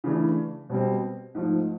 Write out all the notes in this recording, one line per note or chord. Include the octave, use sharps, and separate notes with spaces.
C#3 E3 A3 D4
B2 G3 C4
G#2 F3 A3